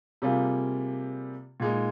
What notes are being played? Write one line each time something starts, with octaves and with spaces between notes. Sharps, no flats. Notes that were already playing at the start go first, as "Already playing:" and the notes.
C3 G3 A#3 F4 G#4
A#2 G#3 D#4